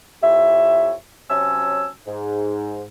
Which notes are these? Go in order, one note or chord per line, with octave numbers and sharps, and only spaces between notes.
F2 E4 G4 C#5 E5
C3 F#3 C#4 G#5 A5 E6
G#2